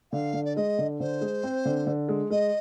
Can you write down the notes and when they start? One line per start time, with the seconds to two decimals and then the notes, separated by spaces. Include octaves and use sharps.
0.12 D3 F5
0.34 D3
0.44 D5
0.56 G#3 D#5
0.79 D3
1.00 D3 C5
1.21 G#3
1.43 C4
1.65 D3
1.87 D3
2.09 G#3
2.31 G#3 D#5